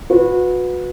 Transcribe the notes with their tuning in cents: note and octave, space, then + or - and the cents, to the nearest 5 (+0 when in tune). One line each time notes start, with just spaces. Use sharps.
F#4 -30 B4 +0